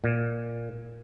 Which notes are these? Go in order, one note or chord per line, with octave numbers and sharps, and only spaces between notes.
A#2